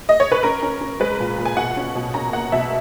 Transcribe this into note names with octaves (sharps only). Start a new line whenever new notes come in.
D#5
C#5
B4
C#4 A#4
C#4
C#4
G#3 B4
A#2
A#2
G#5
B2 F#5
C#4
B2
C#4 A#5
A#3 F#5
B2 E5